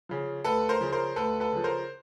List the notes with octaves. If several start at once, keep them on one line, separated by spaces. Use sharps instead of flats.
C#3 F3
D2 A4 B4
A#4 C5
C#3 F3
A#4 C5
D2 A4 B4
A4 B4
C#3 F3
A#4 C5